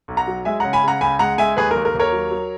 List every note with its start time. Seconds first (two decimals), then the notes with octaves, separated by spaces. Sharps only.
0.08 B1
0.17 F#5 A#5
0.28 F#3
0.45 G#3 E5 G#5
0.60 C#3 F#5 A#5
0.73 G#5 B5
0.83 C#3 F#5 A#5
1.01 C#2 G#5 B5
1.19 G#3 F#5 A#5
1.38 G#3 E5 G#5
1.57 D#2 G#4 B4
1.71 A#4
1.76 D#2
1.85 A#4
1.94 D#2
1.99 A#4 C#5
2.12 F#3
2.31 F#3